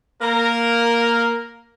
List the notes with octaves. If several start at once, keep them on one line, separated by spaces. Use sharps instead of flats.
A#3 A#4